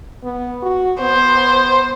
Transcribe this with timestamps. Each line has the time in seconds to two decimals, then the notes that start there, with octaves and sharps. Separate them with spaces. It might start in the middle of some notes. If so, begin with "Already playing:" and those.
0.24 B3
0.63 F#4
1.01 B3 C5